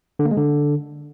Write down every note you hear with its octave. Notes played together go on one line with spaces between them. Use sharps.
D3
A#3
G#3
D3